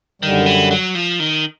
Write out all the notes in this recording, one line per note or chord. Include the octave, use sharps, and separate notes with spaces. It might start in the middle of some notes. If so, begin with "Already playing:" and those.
F#2 D3 D#3 G3
E3
F#3
F3
D#3